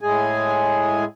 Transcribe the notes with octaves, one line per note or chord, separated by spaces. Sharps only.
A2 G#3 G#4 G#5